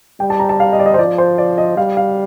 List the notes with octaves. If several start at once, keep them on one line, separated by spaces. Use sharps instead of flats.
G3 G5
A5
A#5
A5
F5
D#5
D5
D#5
C5
F3 D5
C5
D5
D#5
G3 F5
F5